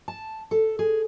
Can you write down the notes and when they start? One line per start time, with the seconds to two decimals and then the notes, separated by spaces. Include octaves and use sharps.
0.08 A5
0.51 A4
0.79 G#4